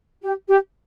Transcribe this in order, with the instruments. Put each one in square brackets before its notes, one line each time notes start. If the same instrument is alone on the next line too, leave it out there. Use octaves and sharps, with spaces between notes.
[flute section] G4
G4